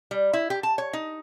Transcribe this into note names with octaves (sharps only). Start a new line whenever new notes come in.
G3
E4
G4
A5
C#5
D#4